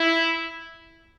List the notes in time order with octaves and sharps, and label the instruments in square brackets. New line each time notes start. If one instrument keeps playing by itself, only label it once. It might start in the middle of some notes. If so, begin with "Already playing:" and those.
Already playing: [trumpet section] E4